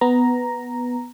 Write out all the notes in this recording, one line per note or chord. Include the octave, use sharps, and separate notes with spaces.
B3 A#5